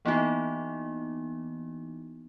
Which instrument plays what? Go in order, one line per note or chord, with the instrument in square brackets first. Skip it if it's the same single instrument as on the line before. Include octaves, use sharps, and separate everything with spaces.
[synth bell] E3 A#3 B3 D#4 E4 F#4